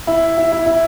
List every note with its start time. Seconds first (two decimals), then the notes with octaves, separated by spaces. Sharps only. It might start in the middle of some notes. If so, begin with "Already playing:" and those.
0.07 E4
0.38 E4
0.52 E4
0.66 E4